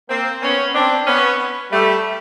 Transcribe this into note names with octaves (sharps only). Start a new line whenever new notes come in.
A#3 C4
B3 C#4
C4 D4
B3 C#4
G3 A3